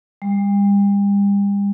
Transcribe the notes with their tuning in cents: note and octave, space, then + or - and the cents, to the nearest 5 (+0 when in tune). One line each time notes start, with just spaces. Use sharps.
G3 +40